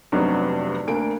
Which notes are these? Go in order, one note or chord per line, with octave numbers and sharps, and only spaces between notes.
F1 G2 C3 F#3 B3 D#4
D2 A#3 D4 D7